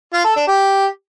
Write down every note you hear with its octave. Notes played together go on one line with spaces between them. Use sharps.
F4
A4
D4
G4